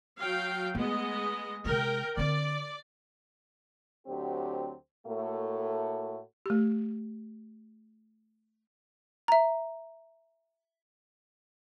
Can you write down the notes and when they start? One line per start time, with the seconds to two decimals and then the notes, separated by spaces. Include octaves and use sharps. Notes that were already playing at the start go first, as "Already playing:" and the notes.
0.20 F#3 F5 G5
0.75 G#3 A3 B3 D#5
1.65 C3 G#3 A#4 G5
2.17 D3 C4 D5
4.07 D2 F#3 C4 G4
5.07 A2 A3 A#3 F#4 A4
6.46 A3 G4
9.28 E5 A#5